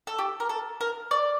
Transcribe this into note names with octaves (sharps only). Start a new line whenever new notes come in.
A4
G4
A#4
A4
A#4
D5